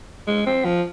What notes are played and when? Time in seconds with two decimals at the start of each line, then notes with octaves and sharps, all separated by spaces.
0.27 G#3
0.46 C4
0.65 F3